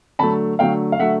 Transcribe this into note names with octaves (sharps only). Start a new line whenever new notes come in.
D3 F#3 A3 A5 B5
D3 F#3 A3 F5 G5
F5
D3 F#3 A3 E5 F#5